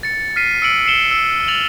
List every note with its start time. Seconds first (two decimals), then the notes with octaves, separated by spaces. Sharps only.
0.03 A6 C#7
0.36 F6 B6 C7 D#7
0.62 E6 C#7 D7 F#7
0.86 C7 C#7 E7 G7
1.11 E6
1.48 A6 F7 F#7